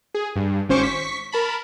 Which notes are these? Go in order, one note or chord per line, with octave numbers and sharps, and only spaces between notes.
G#4
G2
G#1 C#4 C5 C#6 D6
C#6 B6
A#4 A5 B5